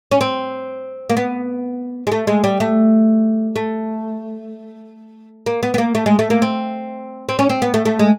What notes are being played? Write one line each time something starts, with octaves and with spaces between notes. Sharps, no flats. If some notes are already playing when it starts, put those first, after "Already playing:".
C#4
C4
A#3
B3
G#3
A3
G#3
G3
A3
A3
A#3
B3
B3
A#3
A3
G#3
A3
A#3
C4
C4
C#4
C4
B3
A3
A3
G#3